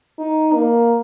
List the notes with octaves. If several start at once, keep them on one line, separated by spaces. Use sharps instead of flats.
D#4
A#3